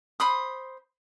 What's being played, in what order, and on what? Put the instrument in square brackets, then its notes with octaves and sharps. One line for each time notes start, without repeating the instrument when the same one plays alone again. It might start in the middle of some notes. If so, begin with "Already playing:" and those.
[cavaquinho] C5 B5 C6 D#6